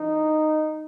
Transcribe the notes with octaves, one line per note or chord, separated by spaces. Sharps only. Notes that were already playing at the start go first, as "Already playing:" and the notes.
Already playing: E3 D#4